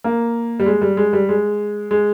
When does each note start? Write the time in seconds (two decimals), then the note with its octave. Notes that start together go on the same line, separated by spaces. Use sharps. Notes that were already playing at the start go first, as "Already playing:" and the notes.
0.04 A#3
0.60 G3
0.66 G#3
0.82 G3
0.97 G#3
1.13 G3
1.29 G#3
1.91 G#3